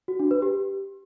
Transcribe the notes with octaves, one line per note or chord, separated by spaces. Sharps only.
F#4
D4
B4
G4